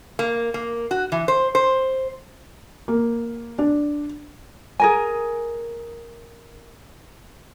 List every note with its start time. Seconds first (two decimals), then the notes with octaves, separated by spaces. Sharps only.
0.19 A#3
0.54 A#3
0.91 F#4
1.12 E3
1.28 C5
1.55 C5
2.88 A#3
3.59 D4
4.80 G#4 A#4 G#5